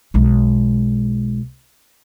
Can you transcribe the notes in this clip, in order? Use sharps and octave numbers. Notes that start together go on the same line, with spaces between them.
B1 G#3